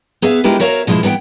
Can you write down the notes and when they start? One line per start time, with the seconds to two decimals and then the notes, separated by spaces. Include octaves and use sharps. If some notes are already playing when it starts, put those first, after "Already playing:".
0.22 B3 G#4 E5 F5
0.44 G#3 E4 F4 G4 A#4 B4
0.60 F#4 A#4 C#5 E5 F5 A#5
0.87 B2 F3 G#3 B3 E4
1.03 E3 B3 A#4 F#5 G5